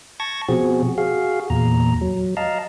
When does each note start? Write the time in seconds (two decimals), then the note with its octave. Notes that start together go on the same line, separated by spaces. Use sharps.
0.20 A5 C#6 G#6 A#6
0.48 B2 F3 C4 F#4 G#4
0.98 F#4 G#4 F5
1.50 E2 A#2 A#5
2.01 F#3
2.37 D#5 F5 A5 A#5